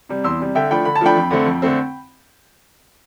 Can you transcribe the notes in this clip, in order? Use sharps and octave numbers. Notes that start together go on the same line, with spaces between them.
C3 G3
E2 C6 E6
C3 G3
D3 E5 G5
F3 A3 D4 G5 B5
D3 B5
A5
F3 A3 D4 G5 B5
F2
D3 A3 C4
F2
D3 A3 C4